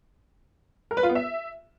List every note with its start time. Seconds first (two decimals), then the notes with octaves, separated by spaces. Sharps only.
0.91 A#4
0.97 B4
1.03 F4
1.09 B3
1.15 E5